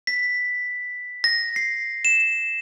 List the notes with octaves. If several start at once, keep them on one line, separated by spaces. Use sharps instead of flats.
B6
A#6
C7
E7